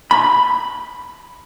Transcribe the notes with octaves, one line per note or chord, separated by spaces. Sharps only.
B5